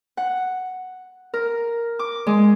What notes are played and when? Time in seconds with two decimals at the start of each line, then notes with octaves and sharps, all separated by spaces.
0.17 F#5
1.34 A#4
1.99 D6
2.27 G#3